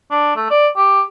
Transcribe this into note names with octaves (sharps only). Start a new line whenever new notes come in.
D4
A3
D5
G4